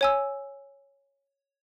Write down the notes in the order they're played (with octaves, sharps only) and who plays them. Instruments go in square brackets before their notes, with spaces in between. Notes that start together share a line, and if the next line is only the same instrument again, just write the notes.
[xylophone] C#5 G#5 E6